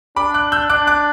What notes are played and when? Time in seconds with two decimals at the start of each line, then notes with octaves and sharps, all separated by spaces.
0.16 D4 B5 D6
0.34 D6 F#6
0.52 E6 G6
0.70 D4 D6 F#6
0.87 D6 F#6